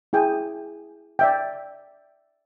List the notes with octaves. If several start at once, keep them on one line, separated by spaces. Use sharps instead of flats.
E4 G#4 G5 G#5
D5 E5 G5